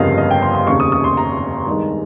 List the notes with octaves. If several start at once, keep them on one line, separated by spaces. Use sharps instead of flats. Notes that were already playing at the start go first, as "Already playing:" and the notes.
Already playing: G1 F2 C#3 G3 A#3 D#5 F5
D#5
G5
C6
C6
F1 D#2 C#3 C#6
D#6
D#6
C6
A#5
G2 D#3 G#3